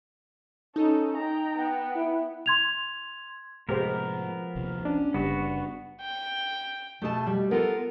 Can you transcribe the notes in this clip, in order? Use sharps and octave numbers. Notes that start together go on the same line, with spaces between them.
C#4 D#4 A4
G5 A#5
B3 G5
E4
C6 G#6 F7
A2 C3 F3 G#3 B3 G4 A#4 C5
A#1 D#2 C3
C#4 D4
F#1 C#3 G3 B3 F#4
G5
B2 A3 G#4 A5
G3
B3 F4 A4 A#4